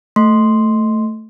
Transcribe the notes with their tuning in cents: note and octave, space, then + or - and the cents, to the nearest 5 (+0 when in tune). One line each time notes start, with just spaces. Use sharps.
A3 +0 C6 +0